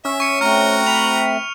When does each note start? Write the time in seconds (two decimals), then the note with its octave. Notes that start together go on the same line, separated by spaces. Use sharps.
0.05 C#4 E5
0.20 C#6 C#7
0.41 A3 C4 F#4 A#5 F6
0.86 B5 F7